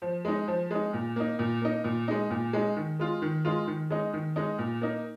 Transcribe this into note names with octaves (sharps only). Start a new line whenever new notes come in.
F3
G#3 D#4
F3
G#3 D#4
A#2
A#3 D#4
A#2
A#3 D#4
A#2
G#3 D#4
A#2
G#3 D#4
D#3
G#3 F4
D#3
G#3 F4
D#3
G#3 D#4
D#3
G#3 D#4
A#2
A#3 D#4